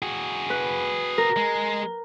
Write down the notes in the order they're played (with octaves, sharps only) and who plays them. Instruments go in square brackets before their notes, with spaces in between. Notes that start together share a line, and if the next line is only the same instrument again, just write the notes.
[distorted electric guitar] F#4 G#4
[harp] B4
A#4
[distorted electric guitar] G#3